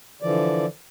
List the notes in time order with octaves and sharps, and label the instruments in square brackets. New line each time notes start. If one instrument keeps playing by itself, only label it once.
[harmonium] D3 E3 F3 D5